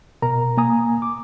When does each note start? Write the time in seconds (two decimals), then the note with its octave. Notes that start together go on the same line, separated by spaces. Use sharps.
0.22 B2 A#4 A#5
0.57 A#3 G#5 A#5 D#6
1.02 D6